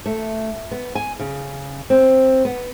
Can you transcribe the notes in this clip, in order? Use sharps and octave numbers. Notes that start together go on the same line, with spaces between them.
A3
B3
G#5
C#3
C4
B3